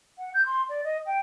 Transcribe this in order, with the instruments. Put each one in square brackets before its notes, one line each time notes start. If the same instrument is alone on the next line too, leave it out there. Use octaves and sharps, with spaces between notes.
[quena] F#5
G6
C6
D5
D#5
G5